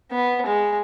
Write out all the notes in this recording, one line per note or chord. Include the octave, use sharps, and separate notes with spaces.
B3
G#3